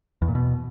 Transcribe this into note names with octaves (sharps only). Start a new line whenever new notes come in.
E2
A#2
B2